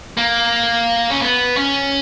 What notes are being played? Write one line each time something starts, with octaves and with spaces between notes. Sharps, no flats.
A#3
C#4
B3
C#4